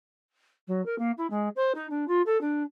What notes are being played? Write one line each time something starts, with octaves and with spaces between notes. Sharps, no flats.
F#3
A#4
A#3
E4
G#3
C5
D#4
D4
F4
A4
D4